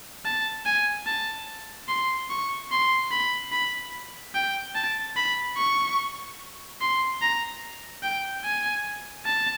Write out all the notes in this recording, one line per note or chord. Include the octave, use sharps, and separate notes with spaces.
A5
G#5
A5
C6
C#6
C6
B5
B5
G5
A5
B5
C#6
C6
A#5
G5
G#5
A5